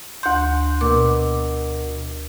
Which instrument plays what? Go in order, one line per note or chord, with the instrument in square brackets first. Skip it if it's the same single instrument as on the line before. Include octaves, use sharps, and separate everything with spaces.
[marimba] D2 G6 [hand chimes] C6
[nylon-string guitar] B2 [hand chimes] A#4 [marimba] D6